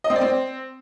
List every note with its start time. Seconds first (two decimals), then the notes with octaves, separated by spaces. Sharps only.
0.04 D#5
0.10 C4
0.16 D5
0.21 C4